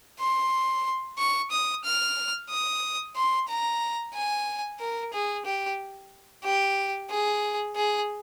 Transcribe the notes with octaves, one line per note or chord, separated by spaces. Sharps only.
C6
C#6
D#6
F6
D#6
C6
A#5
G#5
A#4
G#4
G4
G4
G#4
G#4